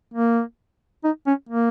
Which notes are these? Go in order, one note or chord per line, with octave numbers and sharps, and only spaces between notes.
A#3
D#4
C#4
A#3